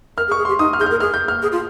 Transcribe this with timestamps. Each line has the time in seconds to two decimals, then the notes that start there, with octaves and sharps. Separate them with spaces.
0.17 A#4 F6
0.28 G#4
0.32 C#6
0.38 G#4
0.45 G4 C6
0.59 D#4 D#6
0.73 F6
0.80 G#4 G6
0.86 A#4 F6
1.00 G#4 F6
1.14 G6
1.28 F6
1.42 G#4
1.52 F4